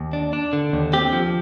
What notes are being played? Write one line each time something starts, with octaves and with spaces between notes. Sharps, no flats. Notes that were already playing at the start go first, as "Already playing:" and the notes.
Already playing: D#2
D4
D4
D3
D#2
C4 G4
F3